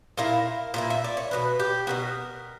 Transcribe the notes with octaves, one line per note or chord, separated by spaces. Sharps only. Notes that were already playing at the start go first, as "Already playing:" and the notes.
A#2 A#3 E4 A#4
A#2 A#3 E4
E5
D5
C#5
B2 F#3 B3 B4
G4
B2 F#3 B3 A#4